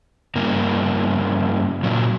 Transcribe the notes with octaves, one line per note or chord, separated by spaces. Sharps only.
G2 C#3 A#3
A#2 F#3